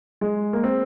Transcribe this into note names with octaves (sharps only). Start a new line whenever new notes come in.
G#3
A#3
C4